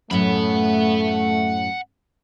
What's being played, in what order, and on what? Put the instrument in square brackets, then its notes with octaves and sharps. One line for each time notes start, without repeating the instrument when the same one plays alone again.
[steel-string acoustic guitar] F#2 A2 [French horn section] A3 [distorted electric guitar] F#5 B5